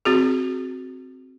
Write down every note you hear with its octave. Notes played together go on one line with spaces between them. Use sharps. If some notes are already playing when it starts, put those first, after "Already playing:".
C4 F#4 G#4